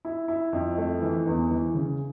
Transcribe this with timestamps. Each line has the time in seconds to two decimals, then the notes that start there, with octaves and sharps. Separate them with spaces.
0.05 E4
0.28 E4
0.53 F2
0.78 A3
1.02 E3
1.27 E2
1.51 E3
1.74 C#3